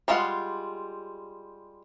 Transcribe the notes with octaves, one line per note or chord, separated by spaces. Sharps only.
G3 G#3 F4 F5 F#5